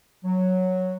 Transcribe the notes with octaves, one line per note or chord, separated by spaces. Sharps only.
F#3